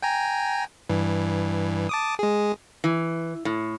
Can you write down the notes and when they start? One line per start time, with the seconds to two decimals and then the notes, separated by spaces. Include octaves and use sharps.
0.02 G5 G#5 A#5
0.89 G2 E3
1.89 A5 D6 D#6
2.19 G#3 G#4
2.84 E3
3.45 A2